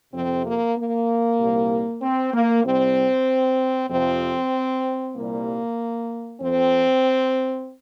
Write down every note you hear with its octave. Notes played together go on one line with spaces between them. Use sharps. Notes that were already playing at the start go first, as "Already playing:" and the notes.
F2 C3 F3 C4
A#3
A#3
C2 A#2 G3
C4
A#3
C2 C3 G3 C4
F2 C3 F3 C4
C2 A#2 G3 A#3
F2 F3 C4